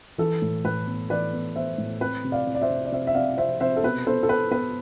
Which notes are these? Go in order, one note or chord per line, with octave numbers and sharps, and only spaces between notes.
E3 A4
A2
A2 B4
B3
E3 B4 D5
B3
B3 C5 E5
A2
C4 B4
C3
D5 F5
C3
D5
C5 E5
C3
D5
C3 C5 E5
E5
C4 D5 F5
C3 C5 E5
C3 C5 E5
A4
B2 B4
B3 A4 C5
A4
B3 B4
B3 B4